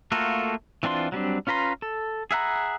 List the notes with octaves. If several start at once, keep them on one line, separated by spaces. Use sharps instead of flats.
A3 A#3 F4 F#4 A4
E3 C4 D4 F4 C6
F#3 G3 C4 D4
C#4 F4 B4 A#5 C6
A4
G#4 E5 F#5 A#5 B5